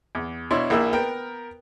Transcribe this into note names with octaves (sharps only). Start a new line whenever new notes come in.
E2
B2 D4 E4 C#5 C6
A#1 A#3 E4 E5 E6
B3 A#4 G5